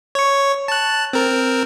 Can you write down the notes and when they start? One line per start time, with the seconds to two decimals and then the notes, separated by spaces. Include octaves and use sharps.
0.15 C#5 C#6
0.68 A5 F#6
1.13 C4 A#4